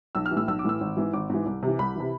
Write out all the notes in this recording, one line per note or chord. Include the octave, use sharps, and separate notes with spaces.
B1 E6
F6
E3
A2 E6
B1 E6
D6
A2 E3 E6
G#1
G#2 E3
G#1 D6
G#2 E3
C2
C3 E3
C2 B5
C3 E3